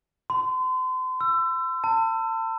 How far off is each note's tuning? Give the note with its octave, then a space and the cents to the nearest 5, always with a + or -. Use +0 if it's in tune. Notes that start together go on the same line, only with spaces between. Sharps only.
C6 -35
E6 +25
A5 +35